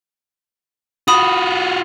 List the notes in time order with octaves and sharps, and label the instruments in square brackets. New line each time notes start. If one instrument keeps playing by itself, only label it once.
[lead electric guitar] F4 F#4 [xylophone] B5 D#6